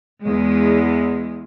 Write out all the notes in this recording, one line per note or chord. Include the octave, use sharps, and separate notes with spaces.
E2 G#3